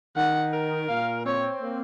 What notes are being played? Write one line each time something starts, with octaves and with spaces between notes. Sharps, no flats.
D#3 F#5
A#4
A#2 F5
C4 C#5
A#3